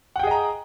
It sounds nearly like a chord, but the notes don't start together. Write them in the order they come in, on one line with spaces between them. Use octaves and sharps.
F#5 G5 G#4 D#5 A#5